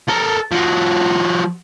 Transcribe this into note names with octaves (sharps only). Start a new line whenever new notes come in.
A4 A#4
F3 F#4